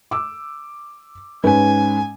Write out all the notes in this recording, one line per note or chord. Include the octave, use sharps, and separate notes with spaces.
D6 E6
G#2 C#4 B4 G#5